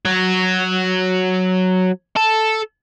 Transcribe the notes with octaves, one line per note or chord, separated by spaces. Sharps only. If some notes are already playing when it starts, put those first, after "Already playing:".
F#3
A4